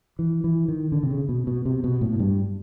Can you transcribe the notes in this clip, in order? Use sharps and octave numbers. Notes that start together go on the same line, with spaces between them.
E3
E3
D#3
D3
C3
C#3
B2
B2
C3
B2
A2
G2